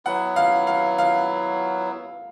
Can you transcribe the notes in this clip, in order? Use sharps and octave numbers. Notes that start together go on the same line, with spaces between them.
F#3 B3 E4 F#5
F5
F5
F5